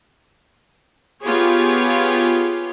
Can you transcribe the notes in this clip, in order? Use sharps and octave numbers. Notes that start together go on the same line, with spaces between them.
B3 F4 G4 G#4 C#5